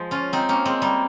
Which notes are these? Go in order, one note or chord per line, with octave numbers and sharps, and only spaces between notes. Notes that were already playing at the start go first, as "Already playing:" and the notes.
Already playing: F3 G#3
C#4 F4
C4 D#4
A#3 C#4
G#3 C4
G3 A#3